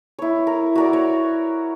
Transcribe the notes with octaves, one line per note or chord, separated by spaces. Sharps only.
E4 C#5
A#4
F#4 A#4 D5
C#5